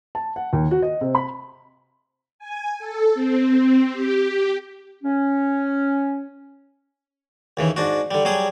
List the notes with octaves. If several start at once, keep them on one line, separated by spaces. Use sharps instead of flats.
A5
F#5
D#2
F#4
D#5
C3
B5
G#5
A4
C4
G4
C#4
D#2 C#3 E3
G#2 D4 F#4
D3 G3
F#3 G3 G#4 D#6